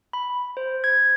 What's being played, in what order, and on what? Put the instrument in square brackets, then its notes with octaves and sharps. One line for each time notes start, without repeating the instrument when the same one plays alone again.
[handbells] B5
C5
G#6